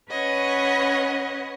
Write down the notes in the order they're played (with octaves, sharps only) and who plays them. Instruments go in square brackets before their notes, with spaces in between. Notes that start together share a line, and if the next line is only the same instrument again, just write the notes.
[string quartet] C#4 B4 C#5 D#5 F#5